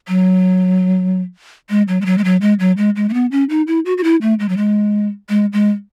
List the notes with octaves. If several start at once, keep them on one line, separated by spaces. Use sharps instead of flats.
F#3
G#3
F#3
G#3
F#3
G#3
F#3
G#3
F#3
G#3
G#3
A3
B3
C#4
D#4
E4
F#4
F#4
E4
A3
G#3
F#3
G#3
G#3
G#3